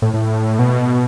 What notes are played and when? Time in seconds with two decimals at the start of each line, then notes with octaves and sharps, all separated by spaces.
0.02 A2
0.14 A2
0.59 B2